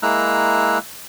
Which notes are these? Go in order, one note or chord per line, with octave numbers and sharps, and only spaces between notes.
G#3 A#3 E4 A#5 E6 F#6